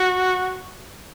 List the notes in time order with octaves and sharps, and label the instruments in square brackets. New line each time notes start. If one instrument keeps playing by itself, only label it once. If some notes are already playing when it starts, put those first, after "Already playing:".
Already playing: [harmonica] F#4